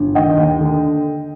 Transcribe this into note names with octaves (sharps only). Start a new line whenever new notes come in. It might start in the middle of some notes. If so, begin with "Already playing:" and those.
Already playing: G1
D#3 D#5 G5
D#2
D3